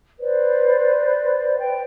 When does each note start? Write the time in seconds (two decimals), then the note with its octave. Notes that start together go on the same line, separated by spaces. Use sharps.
0.19 B4 C5 D5
1.57 G5